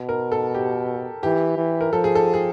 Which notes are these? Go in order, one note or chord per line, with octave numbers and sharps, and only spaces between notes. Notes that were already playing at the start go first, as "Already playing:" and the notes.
Already playing: B2
A#4
A4
G4
E3 G4
E3
A#4
F3 A4
G#4
A4
G#4